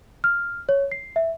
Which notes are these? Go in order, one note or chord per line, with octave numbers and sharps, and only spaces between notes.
F6
C#5
C7
E5